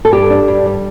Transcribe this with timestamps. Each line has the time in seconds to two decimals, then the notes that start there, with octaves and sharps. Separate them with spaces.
0.05 A4
0.12 G2 G4
0.30 D4
0.48 G2
0.66 G3